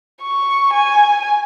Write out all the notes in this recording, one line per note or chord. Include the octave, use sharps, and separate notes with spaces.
C#6
G#5